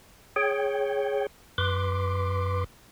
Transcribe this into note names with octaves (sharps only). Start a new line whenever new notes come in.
G#4 C#5 G5
F#2 B4 C6 D6